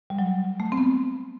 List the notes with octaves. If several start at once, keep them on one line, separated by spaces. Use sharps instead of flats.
G3
F#3
A3
C4
B3